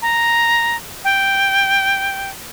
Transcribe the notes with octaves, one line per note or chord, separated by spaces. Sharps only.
A#5
G5